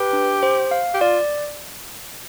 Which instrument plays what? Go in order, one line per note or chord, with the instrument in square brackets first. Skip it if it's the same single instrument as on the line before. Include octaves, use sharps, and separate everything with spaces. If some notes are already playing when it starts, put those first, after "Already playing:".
Already playing: [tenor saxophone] G4 [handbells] B4
[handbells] D4
C5
F5
[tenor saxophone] G4
[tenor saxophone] F4 [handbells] D5